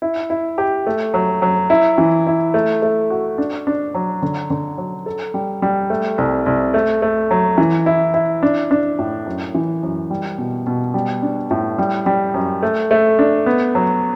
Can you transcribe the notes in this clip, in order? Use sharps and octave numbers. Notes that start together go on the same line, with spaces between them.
E4
E4
G4
A3
F#3
F#3
E4
E3
E4
A3
A3
F#4
D4
D4
F#3
D3
D3
F#3
A4
G3
G3
A3
C2
C2
A3
A3
F#3
E3
E4
E4
D4
D4
A2
F#2
E3
F#2
G3
B2
B2
G3
D4
A2
G3
G3
F#2
A3
A3
D4
B3
F#3